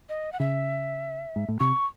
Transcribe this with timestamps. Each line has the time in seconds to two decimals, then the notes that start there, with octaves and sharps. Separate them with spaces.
0.09 D#5
0.32 F#5
0.40 C#3 E5
1.36 G#2
1.48 A2
1.60 C3 C#6